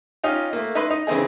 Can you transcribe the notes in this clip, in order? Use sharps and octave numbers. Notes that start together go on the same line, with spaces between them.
C#4 D#4 F4 G4
A3 A#3
D#4 E4 B4 B5 C6
D#4
C#3 E3 C4 D#4 G#4